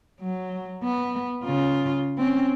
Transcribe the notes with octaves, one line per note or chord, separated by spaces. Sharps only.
F#3
B3
C#3 F4
C4 C#4